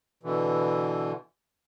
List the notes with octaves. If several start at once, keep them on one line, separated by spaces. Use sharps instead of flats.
B2 D3 E3